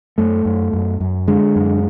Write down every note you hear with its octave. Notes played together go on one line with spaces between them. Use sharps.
F#2 A3
F#2
F#2
F#2
D3 G#3
F#2